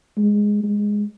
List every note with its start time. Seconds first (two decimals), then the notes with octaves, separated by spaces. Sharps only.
0.17 G#3
0.63 G#3